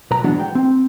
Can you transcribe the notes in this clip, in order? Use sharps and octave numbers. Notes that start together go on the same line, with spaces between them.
B1 B4 A#5
E3 F#3 G#3 B3 D4 F#4
G5
C4